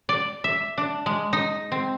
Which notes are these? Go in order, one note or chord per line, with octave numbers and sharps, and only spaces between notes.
D5
E5
D4
G#3
D#4
C4